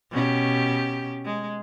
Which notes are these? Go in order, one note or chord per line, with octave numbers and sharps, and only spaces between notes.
B2 C#4 G4
G#3